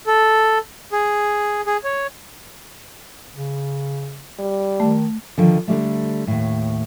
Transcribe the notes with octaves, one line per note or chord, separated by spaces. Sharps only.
A4
G#4
G#4
C#5
C#3
G3
D#3 A3
D3 D#3 F3
D3 G3 A3
D#2 A2